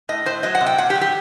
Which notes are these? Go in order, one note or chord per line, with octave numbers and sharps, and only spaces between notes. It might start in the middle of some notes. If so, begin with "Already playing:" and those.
A2 D#5
A2 C5
F#3 D#5
F#5
C3
G5
A#2 F#5
G4
F#3
G4